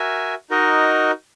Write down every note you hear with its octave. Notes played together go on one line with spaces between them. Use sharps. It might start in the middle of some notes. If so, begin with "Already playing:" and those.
Already playing: F#4 A#4 E5 G#5
D#4 F#4 A#4 D#5